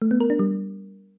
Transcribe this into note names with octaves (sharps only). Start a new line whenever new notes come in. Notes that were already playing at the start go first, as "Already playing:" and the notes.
A3
B3
A#4
D4
G3